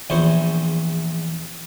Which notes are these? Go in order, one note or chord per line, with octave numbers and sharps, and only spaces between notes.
A#1 E2 E4 C5 C6 C#6